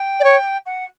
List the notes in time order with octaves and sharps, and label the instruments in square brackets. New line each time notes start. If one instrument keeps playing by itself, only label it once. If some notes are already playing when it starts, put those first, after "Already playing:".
Already playing: [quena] G5
[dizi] D5
C#5
[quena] F#5